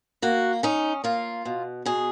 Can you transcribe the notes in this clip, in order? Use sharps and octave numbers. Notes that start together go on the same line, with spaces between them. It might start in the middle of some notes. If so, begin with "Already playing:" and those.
A#3 F#4
C#4 D#4
A#3 F4
B2
B2 G#4